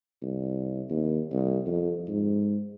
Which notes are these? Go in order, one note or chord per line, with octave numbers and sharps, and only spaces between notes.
C2
D#2
C2
F2
G#2